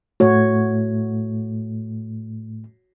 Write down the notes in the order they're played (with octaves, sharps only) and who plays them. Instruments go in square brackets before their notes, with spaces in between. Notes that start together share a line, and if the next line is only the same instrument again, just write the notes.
[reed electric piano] A2 A3 [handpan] F#4 C#5